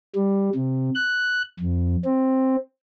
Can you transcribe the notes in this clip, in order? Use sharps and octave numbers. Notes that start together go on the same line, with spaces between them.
G3
C3
F#6
F2
C4